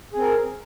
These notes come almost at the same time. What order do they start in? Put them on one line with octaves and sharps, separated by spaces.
G#4 C4 A#4